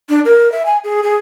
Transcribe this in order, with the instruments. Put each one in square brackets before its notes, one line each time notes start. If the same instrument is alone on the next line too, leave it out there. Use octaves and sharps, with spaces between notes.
[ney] D4
A#4
E5
G#5
G#4
G#4